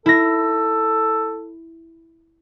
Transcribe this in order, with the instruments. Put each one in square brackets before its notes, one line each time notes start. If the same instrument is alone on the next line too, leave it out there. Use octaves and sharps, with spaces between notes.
[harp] E4 A#6 [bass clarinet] A4